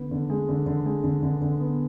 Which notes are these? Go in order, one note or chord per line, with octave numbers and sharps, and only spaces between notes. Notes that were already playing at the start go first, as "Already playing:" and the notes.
Already playing: D3 B3
D3
G#3
D3
D3
G#3
D3
D3
D3
B3